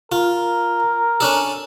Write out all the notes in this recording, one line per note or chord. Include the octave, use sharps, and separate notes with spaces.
F4 A#4
C#4 D4 A4